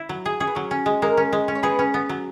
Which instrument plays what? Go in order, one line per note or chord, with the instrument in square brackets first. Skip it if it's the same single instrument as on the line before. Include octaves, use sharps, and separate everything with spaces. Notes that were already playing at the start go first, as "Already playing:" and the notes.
Already playing: [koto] E4
F#3
G#4
[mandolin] C#4 [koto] G#4
[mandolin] B3
[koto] F#3 [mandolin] C#4
[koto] C#4
G#3
[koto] G#3 [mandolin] A#3 A#4
[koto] C#4
G#3
C#4
[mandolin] C#5
[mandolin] B3 B4 [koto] G#4
[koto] C#4
B3
F#3